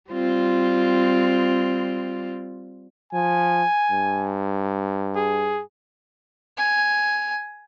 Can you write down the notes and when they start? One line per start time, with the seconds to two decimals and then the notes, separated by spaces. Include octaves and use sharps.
0.11 G3 C4 F4
3.13 F3 G#5
3.91 G2
5.16 G#4
6.57 G#5